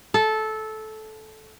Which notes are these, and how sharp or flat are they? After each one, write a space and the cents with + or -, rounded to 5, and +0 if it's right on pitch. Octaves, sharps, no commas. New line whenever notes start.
A4 -15